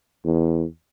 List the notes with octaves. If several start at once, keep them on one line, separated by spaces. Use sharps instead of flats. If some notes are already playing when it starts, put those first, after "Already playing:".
E2